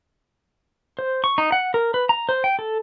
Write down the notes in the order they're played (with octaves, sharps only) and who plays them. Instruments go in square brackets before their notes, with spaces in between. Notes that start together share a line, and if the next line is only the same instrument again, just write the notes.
[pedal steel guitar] C5
C#6
D#4
F#5
A#4
B4
A#5
C5
G5
A4